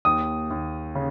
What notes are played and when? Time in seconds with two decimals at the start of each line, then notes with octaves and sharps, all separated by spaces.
0.05 D#2 D#6
0.50 D#2
0.95 C#3